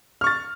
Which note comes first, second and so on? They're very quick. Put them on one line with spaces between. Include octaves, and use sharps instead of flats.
F6 C#6 A6